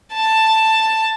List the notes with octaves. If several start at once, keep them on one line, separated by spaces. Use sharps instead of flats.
A5